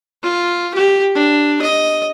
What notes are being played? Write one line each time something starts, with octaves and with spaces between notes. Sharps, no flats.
F4
G4
D4
D#5